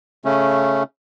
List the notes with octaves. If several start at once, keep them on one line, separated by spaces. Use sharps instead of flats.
C#3 A3 C#4